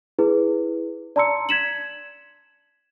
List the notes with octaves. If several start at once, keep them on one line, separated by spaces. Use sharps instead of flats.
E4 G#4 B4
D5 A5 A#5 C6 E6 C#7
G#6 B6 E7 F#7